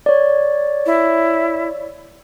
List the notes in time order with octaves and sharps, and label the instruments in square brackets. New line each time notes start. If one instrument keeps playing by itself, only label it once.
[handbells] C#5 D5
[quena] E4